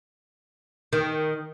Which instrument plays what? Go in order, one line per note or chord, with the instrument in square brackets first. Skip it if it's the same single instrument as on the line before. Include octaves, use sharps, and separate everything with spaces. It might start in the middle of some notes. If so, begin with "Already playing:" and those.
[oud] D#3